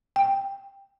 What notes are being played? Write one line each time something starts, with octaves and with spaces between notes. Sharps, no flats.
G5